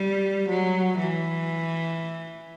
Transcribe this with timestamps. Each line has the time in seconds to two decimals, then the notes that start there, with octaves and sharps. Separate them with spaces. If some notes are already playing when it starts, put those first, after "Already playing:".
Already playing: G3
0.49 F#3
0.98 E3